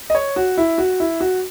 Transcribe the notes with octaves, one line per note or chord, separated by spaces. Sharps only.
D#5
C#5
F#4
E4
F#4
E4
F#4